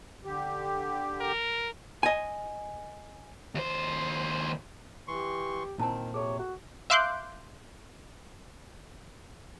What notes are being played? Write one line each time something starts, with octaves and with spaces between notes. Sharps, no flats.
D3 G4
A#4
D#5 G#5
D#2 C5
E3 G4 C6 C#6
A#2 D#3 C4 E4 A5
C3 G#4 A4 C#5
F#4
E5 F5 C6 D6 F#6 G6